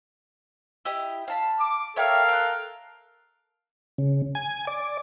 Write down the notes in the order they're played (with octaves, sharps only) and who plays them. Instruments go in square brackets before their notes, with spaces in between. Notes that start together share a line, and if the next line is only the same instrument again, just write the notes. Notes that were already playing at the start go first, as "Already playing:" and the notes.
[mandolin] E4 G4 D#5
F5 A5 B5
[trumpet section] D6
[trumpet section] A4 A#4 F5 [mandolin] C#5 E5 G5
[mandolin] G5 F#6
[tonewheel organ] C#3
G#5
D5